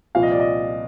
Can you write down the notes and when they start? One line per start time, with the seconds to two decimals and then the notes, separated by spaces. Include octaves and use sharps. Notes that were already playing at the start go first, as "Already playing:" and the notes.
0.15 C2 A#2 F3 F5
0.23 D#5
0.32 D5
0.40 D#5